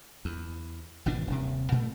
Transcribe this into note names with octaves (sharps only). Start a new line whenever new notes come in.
E2
G#1 B2 E3 D4
D#1 C3
A#2 A3